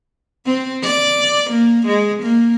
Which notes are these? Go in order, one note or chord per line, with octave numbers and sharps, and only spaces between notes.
C4
D5
A#3
G#3
A#3